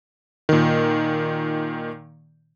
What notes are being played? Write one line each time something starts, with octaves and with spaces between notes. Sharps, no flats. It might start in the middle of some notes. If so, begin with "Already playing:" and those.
A#2 D#3